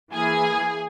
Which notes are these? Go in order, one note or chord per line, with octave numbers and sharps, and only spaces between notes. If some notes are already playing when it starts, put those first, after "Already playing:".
E3 A#3 E4 G#4 G#5